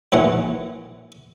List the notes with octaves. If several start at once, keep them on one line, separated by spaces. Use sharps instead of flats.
A#1 D#2 E3 F#5